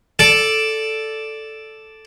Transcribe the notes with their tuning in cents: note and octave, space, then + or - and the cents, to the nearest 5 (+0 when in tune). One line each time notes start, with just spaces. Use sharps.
A4 +0 D5 +0